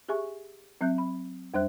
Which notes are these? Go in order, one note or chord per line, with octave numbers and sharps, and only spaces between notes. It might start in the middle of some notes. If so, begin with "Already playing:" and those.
G4 G#4 E5 G#5 C#6
F#3 C4 E5 F#6 G6
B5
F2 G3 D4 C5 E5 F#6